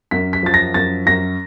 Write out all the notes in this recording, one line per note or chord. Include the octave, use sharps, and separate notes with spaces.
F#2 B6
B6
F3 A6
A#6
F#2 A6
F#2 A#6